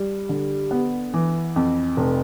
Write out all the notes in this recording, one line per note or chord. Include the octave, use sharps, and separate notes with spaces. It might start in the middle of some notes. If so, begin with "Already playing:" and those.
Already playing: G3
D3
B3
E3
F2
F1